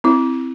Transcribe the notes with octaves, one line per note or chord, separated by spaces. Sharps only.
C4 E4